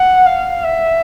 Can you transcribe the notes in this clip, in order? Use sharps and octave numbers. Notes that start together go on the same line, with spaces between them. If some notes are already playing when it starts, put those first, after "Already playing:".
Already playing: F#5
F5
E5